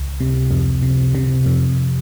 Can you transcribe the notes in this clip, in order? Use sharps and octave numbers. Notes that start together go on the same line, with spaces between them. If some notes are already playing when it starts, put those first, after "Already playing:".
Already playing: C#2
C3
F2
C3
C3
F2